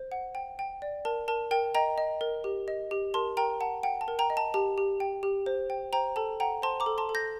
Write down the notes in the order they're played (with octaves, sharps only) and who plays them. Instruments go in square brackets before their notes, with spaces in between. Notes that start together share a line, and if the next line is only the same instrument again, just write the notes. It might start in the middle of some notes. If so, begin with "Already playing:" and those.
Already playing: [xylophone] C5
F#5
G5
G5
D5
A#4 A5
A#4 A5
A#4 G5
D#5 G5 A#5
D#5
A#4
G4
D#5
G4
A#4 A5 C6
A#4 G5 A#5
F#5 A5
F#5 G5
A5
A#4
G5 A#5
D#5
A5
G4 A5
G4
G5
G4
C5
G5
C5 G5 A#5
A4 A5
F#5 G5 A#5
C5 A5 C6
A#5 D6
A4
A5 C6
A4
G6 A#6